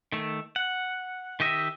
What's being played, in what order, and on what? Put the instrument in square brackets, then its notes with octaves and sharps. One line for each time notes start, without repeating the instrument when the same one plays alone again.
[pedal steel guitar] D#3 A3
F#5
D#3 G4 D#5 E5